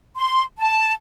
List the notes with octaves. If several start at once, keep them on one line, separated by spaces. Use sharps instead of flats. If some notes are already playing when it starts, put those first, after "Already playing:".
C6
A5